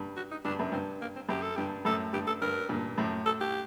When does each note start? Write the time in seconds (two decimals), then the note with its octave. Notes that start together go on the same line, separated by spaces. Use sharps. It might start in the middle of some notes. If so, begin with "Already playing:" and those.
Already playing: G2
0.16 F#4
0.31 D#4
0.45 G2 D4
0.59 F#2
0.72 G2 C4
1.01 A#3
1.16 C4
1.29 F#2 G4
1.42 A4
1.56 G2 G4
1.85 F#2 A2 A4
2.13 G2 G4
2.27 A4
2.41 G2 A#4
2.69 G2 A#2
2.98 F#2 A2
3.26 A4
3.41 G4